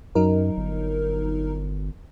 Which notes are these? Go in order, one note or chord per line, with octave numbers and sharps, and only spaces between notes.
F#2 F#3 D#4 A#4
G1